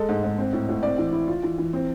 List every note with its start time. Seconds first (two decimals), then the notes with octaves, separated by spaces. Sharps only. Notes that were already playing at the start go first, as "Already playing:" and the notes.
Already playing: G#3 A4
0.09 G#2
0.23 G#2
0.38 C4
0.53 A2
0.69 A2
0.83 C4 D5
0.98 E3
1.13 E4
1.28 F4
1.43 E3
1.58 E3
1.73 C4